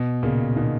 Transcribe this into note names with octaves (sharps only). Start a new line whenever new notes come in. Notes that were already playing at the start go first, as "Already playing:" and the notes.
Already playing: B2
A#2 C#3
B2 D#3